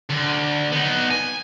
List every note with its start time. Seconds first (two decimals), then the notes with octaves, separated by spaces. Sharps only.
0.10 D2
0.72 B3 D#4
1.11 G#5